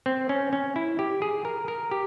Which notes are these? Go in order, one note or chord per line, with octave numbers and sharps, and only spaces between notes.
C4
C#4
C#4
E4
G4
G#4
A#4
A#4
G4